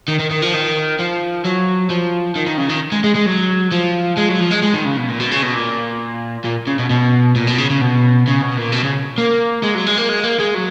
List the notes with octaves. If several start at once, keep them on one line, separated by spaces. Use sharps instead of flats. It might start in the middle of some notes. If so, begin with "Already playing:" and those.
D#3
D#3
D#3
F3
D#3
F3
F#3
F3
D#3
D#3
C#3
D#3
G#3
G#3
G#3
F#3
F3
G#3
F#3
F3
G#3
G#3
D#3
C#3
B2
A#2
B2
C#3
B2
A#2
A#2
C#3
B2
B2
A#2
B2
C#3
C#3
B2
C#3
B2
A#2
B2
C#3
A#3
G#3
F#3
G#3
A#3
G#3
A#3
G#3
F#3